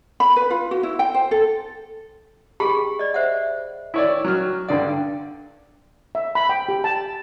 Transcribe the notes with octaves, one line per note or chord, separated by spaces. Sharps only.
B5
B4
F4
F#4
E4
G5
C5
A4
G4 G#4 B5
D5 D#5
C5 E5 F#5
E4 C#5 D5
F#3 F6
G2 D3 D5 F#5
E5
B5
G5
G4
A5